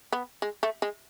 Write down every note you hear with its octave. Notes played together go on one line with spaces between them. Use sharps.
B3
G#3
A3
G#3